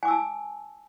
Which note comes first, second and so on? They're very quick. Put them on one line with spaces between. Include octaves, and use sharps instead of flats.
G#5 D6 E6 A5